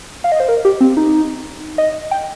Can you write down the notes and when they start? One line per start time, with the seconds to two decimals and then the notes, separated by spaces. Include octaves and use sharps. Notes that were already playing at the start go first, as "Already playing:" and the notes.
0.24 F5
0.32 D#5
0.40 C5
0.49 A#4
0.65 G4
0.81 C4
0.97 D#4
1.78 D#5
2.11 G5